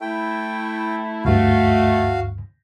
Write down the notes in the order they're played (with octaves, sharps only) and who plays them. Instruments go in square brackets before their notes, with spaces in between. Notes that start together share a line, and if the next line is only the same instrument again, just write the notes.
[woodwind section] A3 E4 [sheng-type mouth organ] G5
[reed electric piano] D2 G2 [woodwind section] A3 [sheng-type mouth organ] F#4 F5